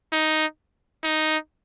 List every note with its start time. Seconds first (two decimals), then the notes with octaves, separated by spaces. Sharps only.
0.12 D#4
1.04 D#4